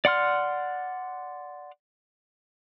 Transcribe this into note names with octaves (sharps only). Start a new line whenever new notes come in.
D5 F#5 C6 F6